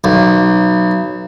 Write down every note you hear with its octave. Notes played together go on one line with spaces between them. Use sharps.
B1